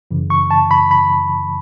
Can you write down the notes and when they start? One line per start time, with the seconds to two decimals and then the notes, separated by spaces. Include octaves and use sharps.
0.11 F#2 C#3 E3
0.30 C#6
0.51 A5
0.71 B5
0.91 B5